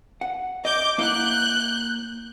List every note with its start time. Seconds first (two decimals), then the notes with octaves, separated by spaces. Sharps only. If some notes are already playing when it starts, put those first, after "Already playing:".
0.21 F#5
0.65 D#5 D6 G6
0.98 A#3 E4 F#5 F#6 G6